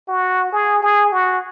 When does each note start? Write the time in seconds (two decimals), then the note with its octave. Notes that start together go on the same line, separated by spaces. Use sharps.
0.08 F#4
0.52 G#4
0.83 G#4
1.12 F#4